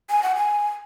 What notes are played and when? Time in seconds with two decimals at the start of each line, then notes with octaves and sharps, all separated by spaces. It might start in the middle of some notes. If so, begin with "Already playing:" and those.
0.10 G#5
0.23 F#5
0.36 G#5